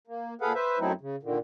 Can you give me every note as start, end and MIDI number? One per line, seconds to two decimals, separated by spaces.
0.07 0.34 58
0.41 0.53 46
0.41 0.53 68
0.41 0.53 69
0.41 0.53 71
0.41 0.53 77
0.41 0.53 78
0.54 0.79 71
0.54 0.79 72
0.54 0.79 76
0.79 0.93 42
0.79 0.93 54
0.79 0.93 57
0.79 0.93 60
0.79 0.93 63
0.79 0.93 64
1.01 1.16 49
1.23 1.38 46
1.23 1.38 50
1.23 1.38 51